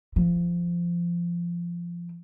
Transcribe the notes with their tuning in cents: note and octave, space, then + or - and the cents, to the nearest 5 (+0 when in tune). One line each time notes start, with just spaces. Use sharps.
F3 -15